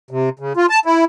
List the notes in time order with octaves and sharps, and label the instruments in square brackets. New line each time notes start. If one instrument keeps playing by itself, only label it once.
[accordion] C3
C#3
F4
A5
E4